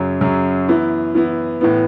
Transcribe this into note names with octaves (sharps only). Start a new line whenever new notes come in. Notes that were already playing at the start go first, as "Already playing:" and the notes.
Already playing: F#2 C#3 F#3
F#2 C#3 F#3
E3 B3 E4
E3 B3 E4
A2 E3 B3